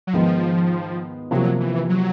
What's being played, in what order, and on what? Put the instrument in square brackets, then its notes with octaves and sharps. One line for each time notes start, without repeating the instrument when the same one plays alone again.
[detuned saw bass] F#3
[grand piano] G#2 D#3 G#3 B3 [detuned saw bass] F3
[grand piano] C3 F3 A#3 [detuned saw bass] F#3
[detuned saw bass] E3
F#3